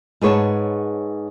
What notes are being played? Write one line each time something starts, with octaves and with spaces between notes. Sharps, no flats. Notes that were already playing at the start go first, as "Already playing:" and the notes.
G#2 G#4 B4 C#5 F#5 A5